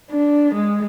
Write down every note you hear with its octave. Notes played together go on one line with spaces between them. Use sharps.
D4
G#3